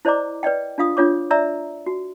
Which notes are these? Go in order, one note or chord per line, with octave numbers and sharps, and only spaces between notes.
E4 C5 D5 D#5 A#5 D6
B4 D5 D#5 G5
D4 F4 F5 D#6
D4 F4 C#5 D6
D5 E5 A#5 E6
F#4